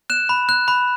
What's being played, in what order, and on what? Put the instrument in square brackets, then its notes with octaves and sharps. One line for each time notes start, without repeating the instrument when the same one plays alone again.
[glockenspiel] F#6 E7
B5
F#6
B5